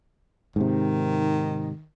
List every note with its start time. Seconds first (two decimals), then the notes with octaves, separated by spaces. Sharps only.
0.56 G#2 C3 D#3